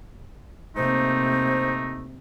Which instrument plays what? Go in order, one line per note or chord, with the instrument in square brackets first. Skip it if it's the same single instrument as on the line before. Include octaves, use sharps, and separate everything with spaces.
[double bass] C3 A#3 [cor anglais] A3 [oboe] D#4 [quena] C5